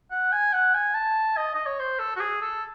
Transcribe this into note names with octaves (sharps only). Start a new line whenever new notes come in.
F#5
G#5
F#5
G#5
A5
D#5
D#5
C#5
C5
A4
F#4
G#4
A4